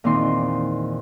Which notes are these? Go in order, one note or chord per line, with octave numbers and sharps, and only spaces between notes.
E2 A#2 D#3 C4 D#4 C6